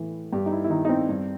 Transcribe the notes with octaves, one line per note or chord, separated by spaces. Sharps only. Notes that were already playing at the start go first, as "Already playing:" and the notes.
Already playing: A2 E3
G2 G4
D#4
E4
E4
D#3 D#4
D#4
C4
G2